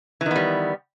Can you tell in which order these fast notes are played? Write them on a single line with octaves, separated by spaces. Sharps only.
E3 D#3 B3 G3